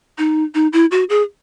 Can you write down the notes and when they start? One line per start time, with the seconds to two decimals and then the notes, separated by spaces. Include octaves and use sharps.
0.18 D#4
0.55 D#4
0.73 E4
0.91 F#4
1.10 G#4